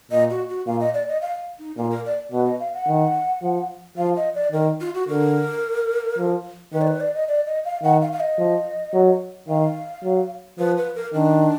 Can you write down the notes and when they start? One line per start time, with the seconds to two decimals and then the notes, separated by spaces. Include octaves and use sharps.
0.11 A#2 D#5
0.30 F#4
0.49 F#4
0.67 A#2 F5
0.80 D#5
0.94 D5
1.08 D#5
1.22 F5
1.59 D#4
1.77 A#2 F4
1.91 A#4
2.05 D5
2.32 B2 B4
2.46 D#5
2.60 F5
2.74 F#5
2.88 D#3
3.43 F3
3.97 F3 F5
4.16 D#5
4.35 D5
4.52 D#3 A#4
4.81 F4
4.95 F#4
5.08 D3 A#4
6.18 F3
6.73 D#3 B4
6.81 D5
6.87 B4
7.00 D5
7.15 D#5
7.28 D5
7.47 D#5
7.65 F5
7.83 D#3 F#5
8.02 F5
8.12 F5
8.20 D#5
8.38 F3
8.94 F#3
9.48 D#3 F5
10.04 F#3
10.59 F3 B4
10.77 B4
10.95 A#4
11.14 D#3 D4